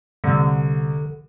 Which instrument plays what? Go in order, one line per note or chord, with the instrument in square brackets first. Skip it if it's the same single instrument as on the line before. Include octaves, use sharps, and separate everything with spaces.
[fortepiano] C2 [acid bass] D3